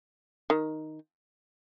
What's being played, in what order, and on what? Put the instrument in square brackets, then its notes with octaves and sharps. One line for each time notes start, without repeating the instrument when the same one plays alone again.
[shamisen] D#3